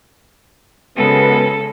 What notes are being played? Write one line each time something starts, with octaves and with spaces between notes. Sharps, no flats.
F#2 C#3 G#3 B3 A4